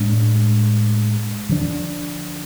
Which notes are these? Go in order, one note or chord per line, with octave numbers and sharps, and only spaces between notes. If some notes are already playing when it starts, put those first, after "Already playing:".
Already playing: A2 G#3 D4
D3 F3 A3 D4